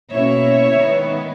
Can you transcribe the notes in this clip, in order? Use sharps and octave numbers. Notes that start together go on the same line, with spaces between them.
B2 A#3 C#4 E4 C#5 E5
D#3 G#3 B3